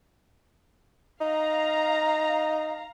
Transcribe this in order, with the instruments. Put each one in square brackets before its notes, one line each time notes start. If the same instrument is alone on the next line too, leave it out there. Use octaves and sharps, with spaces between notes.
[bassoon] D#4 [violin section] F5 A#5